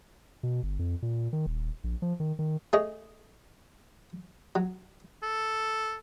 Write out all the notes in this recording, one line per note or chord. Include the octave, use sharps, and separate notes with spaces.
B2
G1
F2
A#2
D#3
D#1
A#1
F3
D#3
D#3
A3 G#4 C#5 D#5
F#3
A4